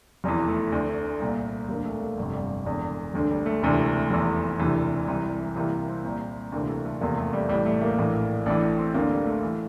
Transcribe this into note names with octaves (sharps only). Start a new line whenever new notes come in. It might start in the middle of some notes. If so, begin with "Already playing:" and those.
F1 E2 E3
A3
D2 D3
C2 A#2
E1 D2 D3 A#3
A3
A#3
G1 F2 C3
G3
E1 E2 D3
E1 D2 D3
G3
A3
E1 D2 C3 E3 A3
F1 E2 E3
E1 D2 C3 E3
C2 C3 E3
C2 C3 E3 A#3
C4
C2 A#2
D2 C3 E3 A#3
A3
A3
F1 E2 C3 E3 A#3
A3
G3
A1 A2 E3 G3
A3
A#3
A#1 A2 E3
A1 A2 E3 D4
D4
C4
D2 D3 A#3
G3
A3
E3